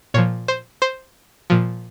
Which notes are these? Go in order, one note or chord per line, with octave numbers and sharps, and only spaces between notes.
A#2 F3 C#5
C5
C5
A#2 F3